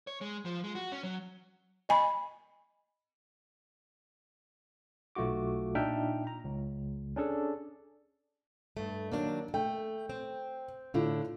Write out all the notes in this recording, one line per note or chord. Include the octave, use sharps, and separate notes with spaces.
C#5
G#3
F3
G#3
F#4
C#4
F#3
D#5 G#5 B5
B1 A3 F4 F#4 D6
A#2 D4 D#4 E5 G5 F6
A#5
C#2
C#4 D4 G#4 A4 D5
G2 A3
D#3 F#3 A#3 D4
A3 G5
C4
A2 D3 E4 F4